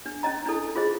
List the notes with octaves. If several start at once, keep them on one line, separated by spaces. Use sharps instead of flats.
D4
C#4 D#4 D#5 A#5
D4 E4 A4
F4 G#4 C5 D#5